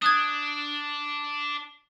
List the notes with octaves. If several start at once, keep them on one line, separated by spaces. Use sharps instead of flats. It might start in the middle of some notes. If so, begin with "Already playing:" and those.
D4 D#6 F#6 G#6